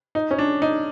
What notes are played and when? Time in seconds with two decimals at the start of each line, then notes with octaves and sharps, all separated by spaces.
0.15 D#4
0.31 C#4
0.39 D4
0.62 D#4